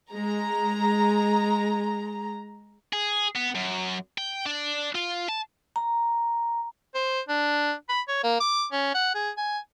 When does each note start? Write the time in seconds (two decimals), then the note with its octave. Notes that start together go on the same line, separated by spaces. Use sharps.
0.12 G#3 A#5
2.93 G#4
3.36 B3
3.55 F#2
4.18 G5
4.46 D4
4.95 F4
5.29 A5
5.76 A#5
6.95 C5
7.29 D4
7.89 B5
8.08 C#5
8.24 A#3
8.40 D6
8.72 C#4
8.95 F#5
9.15 G#4
9.37 G#5